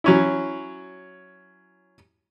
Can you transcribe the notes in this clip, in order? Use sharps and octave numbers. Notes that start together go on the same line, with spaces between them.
F#3 C#4 E4